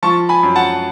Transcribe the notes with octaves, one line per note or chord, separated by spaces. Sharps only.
F3 A5 C#6
G#5 B5
F#2
F#5 A5